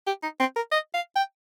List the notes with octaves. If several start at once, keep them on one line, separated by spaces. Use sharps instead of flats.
G4
D#4
C4
A#4
D#5
F5
G5